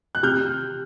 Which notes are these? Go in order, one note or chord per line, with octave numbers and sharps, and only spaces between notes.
F#6
C3 F6 G6